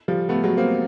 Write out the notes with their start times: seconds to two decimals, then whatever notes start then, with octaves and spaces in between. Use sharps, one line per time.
0.08 F3 G3
0.29 A3 B3
0.43 F#3 G#3
0.57 A#3 C4